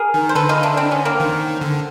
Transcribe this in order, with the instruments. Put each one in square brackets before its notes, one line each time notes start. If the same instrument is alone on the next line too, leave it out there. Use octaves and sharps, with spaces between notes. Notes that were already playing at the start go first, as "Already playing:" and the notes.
Already playing: [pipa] G#4 A#4
[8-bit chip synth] D#3
[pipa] C5
[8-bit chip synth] D3 [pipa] A4 B4
[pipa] D#4 F4
D4 E4
C4 D4
B3 C#4
A#3 C4
[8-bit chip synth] D#3
D3